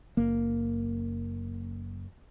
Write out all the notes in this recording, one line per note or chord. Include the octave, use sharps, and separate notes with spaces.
F#1 A#3